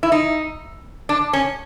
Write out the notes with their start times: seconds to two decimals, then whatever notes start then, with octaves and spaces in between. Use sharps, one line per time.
0.03 E4
0.12 D#4
1.09 D4
1.33 C#4